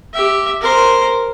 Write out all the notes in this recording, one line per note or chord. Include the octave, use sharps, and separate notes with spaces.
G4 E5
A#4 C5